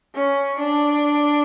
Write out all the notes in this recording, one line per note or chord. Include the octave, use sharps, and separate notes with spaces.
C#4
D4